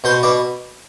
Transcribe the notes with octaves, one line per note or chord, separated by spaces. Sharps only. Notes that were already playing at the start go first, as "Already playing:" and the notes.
B2 C5
B2 D5